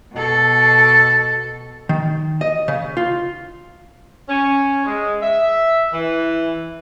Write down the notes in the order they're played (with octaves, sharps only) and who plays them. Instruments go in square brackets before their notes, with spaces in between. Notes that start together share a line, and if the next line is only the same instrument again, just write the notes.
[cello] B2 A4
[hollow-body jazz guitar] D#3
D#5
C#3
F4
[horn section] C#4
G#3
E5
E3